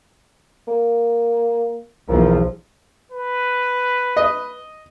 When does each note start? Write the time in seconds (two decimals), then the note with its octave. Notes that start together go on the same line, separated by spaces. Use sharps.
0.68 A#3
2.08 B1 E2 F3 A#3
3.12 B4
4.17 D#5